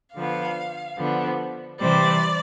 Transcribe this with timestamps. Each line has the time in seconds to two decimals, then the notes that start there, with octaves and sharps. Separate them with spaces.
0.14 D3 F3 B3 F5
0.97 D3 F3 B3
1.80 C3 E3 G3 C4 D5